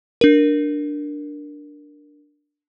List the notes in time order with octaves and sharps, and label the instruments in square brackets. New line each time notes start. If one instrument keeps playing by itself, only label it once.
[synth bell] D4 A#4